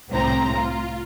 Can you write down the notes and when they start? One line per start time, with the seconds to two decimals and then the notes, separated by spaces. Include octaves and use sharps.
0.11 C2 A2 C4 A#5
0.55 F4